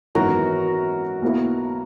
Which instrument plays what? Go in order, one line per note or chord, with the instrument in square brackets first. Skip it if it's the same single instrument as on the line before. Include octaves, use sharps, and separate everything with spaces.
[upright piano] G#1 F#2 E3 B3 D#4 [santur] F#4 A#4
[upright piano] B1 B2 A#3 E4